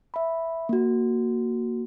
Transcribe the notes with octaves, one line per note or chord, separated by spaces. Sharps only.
E5 B5
A#3 F#4